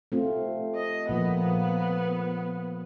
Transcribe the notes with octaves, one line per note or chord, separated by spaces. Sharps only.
A3 C4 F4
D#5
A#2 F3 A#3 B3